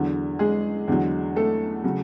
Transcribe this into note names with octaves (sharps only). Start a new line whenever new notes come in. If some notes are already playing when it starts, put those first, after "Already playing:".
Already playing: E2 D3 F#3
G#3 G#4
E2 D3 F#3
A3 A4
C#3 F#3